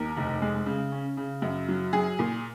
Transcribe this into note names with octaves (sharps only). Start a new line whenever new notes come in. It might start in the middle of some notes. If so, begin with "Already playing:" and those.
Already playing: D#2 A#4
F1
G#3
C#3
C#4
C#3
F#2
F#3
F#3 G#4
A#2